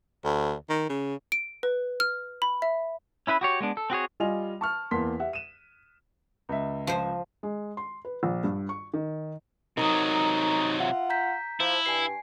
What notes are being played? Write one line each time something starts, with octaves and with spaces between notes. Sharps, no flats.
D2
D#3
C#3
D7
B4
F6
B5
E5
C#4 E4 B4 E5
F#4 G4 C#5
G#3 B3 D4
A4
C4 F#4 G#4 C#5
G3 F4 D#5 G#5 F7
A5 C#6 F6
E2 A#3 A5 C6 B6
G4 E5 F#5
D#7 E7
C#2 E5
F3 C5
G#3
C6
B4
A#1
G2
C#6
D#3
C3 F#3 D#4 A#4 A#5 D#6
F4 E5 F#5
A#5 G6 B6
F3 E4
G2 G#5 C7